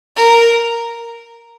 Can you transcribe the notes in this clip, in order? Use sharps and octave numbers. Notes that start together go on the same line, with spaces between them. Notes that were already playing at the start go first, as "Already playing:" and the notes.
A#4